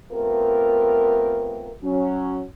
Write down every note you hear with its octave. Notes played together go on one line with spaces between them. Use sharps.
A3 B3 C4 F4 G4 A#4
F#3 C#4